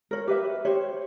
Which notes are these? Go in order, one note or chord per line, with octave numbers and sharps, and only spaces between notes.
A#4 C#5
G4 B4 E5
G4 C5 C#5